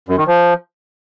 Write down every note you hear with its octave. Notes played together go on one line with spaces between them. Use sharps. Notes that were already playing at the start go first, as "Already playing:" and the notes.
F#2
D#3
F3